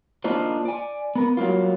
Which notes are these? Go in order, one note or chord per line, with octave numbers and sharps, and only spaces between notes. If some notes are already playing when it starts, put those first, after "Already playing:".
A#3 D4 D#4 F4 C5
D5 G#5
B3 A#4
F#3 G3 A#3 F4